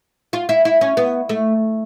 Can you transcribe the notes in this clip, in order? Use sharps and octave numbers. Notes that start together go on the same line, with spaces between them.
F4
E4
E4
C#4
B3
A3